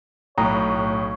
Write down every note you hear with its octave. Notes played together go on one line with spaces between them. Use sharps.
B1 A2 C#5 G5 A#5 D#6